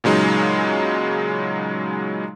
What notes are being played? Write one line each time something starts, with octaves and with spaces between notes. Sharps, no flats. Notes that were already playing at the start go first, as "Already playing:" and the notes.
A#2 C#3 F#3 G#3 D#4